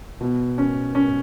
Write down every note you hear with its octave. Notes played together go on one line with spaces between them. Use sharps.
B2
C#4
C#4